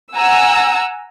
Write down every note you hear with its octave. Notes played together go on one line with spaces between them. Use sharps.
F#5 G#5 A#5 E6